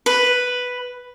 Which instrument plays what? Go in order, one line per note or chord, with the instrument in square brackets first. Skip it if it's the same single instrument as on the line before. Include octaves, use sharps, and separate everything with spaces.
[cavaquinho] B4